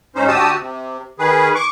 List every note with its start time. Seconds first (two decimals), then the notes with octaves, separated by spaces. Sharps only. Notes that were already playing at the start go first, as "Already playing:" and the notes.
0.15 G#2 C#4 D#4 C5
0.28 D2 F#4 G4 A5 D#6 E6
0.60 C3
1.19 D#3 G#4 B4
1.55 C#6 D6